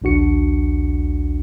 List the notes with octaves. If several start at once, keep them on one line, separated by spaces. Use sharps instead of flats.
A#1 D#2 D4 F#4 C#7